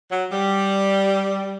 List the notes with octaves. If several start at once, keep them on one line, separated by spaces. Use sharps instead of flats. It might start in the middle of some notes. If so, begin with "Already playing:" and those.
F#3
G3